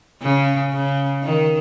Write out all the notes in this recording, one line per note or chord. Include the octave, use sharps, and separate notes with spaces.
C#3
C#3
D#3